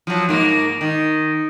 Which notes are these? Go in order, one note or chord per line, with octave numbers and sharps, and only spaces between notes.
F3 F#3
G#2 A#3
D#3